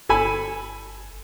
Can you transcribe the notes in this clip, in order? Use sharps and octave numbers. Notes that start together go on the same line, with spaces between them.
G1 A4 G#5 B5